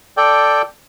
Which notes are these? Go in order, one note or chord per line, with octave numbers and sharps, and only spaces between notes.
A4 D5 G5